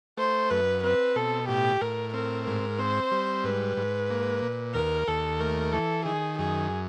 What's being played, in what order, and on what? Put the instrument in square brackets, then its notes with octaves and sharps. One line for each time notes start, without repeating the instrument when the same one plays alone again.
[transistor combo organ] A3 [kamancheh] C5
[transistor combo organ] F#2 [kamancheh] B4
[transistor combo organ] C4 [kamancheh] B4
[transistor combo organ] B2 [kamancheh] A4
[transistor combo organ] A2 [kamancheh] G4
[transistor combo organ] A2 [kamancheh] A#4
[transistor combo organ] C4 [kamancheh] A#4
[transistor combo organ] G#2 [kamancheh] A#4
[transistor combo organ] C4 [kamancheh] C5
[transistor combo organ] G3
[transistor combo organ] G#2 [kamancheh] B4
[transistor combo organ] G#2
A#3
A#2
[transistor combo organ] D#2 [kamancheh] A#4
[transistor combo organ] D#2 [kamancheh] A4
[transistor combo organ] A3 [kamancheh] A#4
[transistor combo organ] E3 [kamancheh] A4
[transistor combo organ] D#3 [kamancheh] G#4
[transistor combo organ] F#2 [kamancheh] G#4